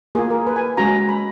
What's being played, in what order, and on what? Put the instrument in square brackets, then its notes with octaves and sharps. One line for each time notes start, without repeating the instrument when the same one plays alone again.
[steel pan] A#3 F4 G#4
A#4
B4
G#5
G#3 C#4 F#4 A#5
B5